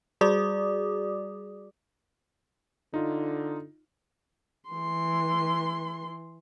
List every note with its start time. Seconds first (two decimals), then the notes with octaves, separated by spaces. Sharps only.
0.21 G3 F#4 G#4 D5 D6 D#6
2.94 D3 D#4 F4
4.70 E3 C6